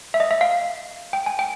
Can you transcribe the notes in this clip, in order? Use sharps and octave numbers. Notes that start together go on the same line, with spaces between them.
E5
D#5
E5
F5
G5
G#5
G5